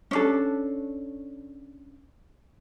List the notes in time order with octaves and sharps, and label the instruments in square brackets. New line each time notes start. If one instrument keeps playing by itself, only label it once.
[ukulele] C#4 D4 A4